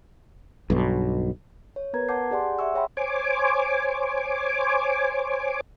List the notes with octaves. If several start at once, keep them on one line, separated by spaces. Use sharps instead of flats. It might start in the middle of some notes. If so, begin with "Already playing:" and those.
B1 G2 B2
C#5
B3 A#4 B4 A#5 G#6
F#5 A5 D6 G6 C7
G4 G#4 D5 F#5 G#5 C6
E5 F#5 G#5 C#6 E6
G#4 C#5 E5 G5 B5 C6
C5 C#5 G#5 D6